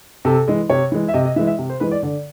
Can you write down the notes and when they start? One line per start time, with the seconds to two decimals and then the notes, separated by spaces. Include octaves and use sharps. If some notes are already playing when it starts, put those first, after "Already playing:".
0.25 C3 A4
0.48 E3 G#3
0.70 C3 C#5
0.92 E3 G#3
1.08 E5
1.14 C3 D#5
1.25 D#5
1.36 E3 E5
1.39 G#3
1.47 E5
1.59 C3
1.69 C5
1.80 E3 G#3 B4
1.91 D5
2.03 D3 D5